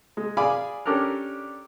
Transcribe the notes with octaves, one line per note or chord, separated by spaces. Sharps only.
G#3
G#4 D5 F5 G#5 B5 D6
C#4 D4 G4 A4 A#4